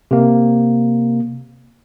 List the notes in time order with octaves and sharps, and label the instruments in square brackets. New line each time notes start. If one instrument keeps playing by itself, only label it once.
[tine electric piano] C3 A#3